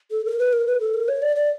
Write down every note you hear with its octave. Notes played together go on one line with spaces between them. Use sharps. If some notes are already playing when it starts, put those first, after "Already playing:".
A4
A#4
B4
A#4
B4
A4
A#4
C#5
D5
D5